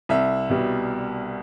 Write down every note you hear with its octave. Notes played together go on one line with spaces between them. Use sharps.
C2 E5
B2 G3